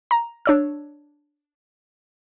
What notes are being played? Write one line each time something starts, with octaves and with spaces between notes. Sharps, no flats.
A#5
D4 C#5 E6